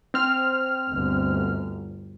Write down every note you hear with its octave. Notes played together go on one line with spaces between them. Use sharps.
C4 F6
G1 D2